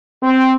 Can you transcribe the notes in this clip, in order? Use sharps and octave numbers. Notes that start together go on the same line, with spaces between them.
C4